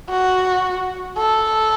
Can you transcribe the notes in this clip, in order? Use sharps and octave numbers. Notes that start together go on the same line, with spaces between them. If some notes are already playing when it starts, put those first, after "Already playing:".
F#4
A4